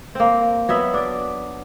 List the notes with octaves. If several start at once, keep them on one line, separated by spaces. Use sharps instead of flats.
A#3 C4
F#3 B3 E5
D4 D5